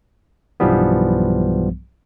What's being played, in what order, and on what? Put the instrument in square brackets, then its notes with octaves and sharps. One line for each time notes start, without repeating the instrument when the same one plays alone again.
[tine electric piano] B1 G2 E3 F3 G3 B3